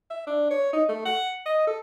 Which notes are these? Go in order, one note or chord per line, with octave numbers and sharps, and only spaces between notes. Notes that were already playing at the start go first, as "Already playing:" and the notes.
E5
D4
C#5
D#4
A3
F#5
D#5
A4